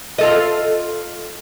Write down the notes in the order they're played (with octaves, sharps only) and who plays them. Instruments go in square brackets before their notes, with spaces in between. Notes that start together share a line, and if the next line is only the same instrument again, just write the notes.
[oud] F4 A4 D#5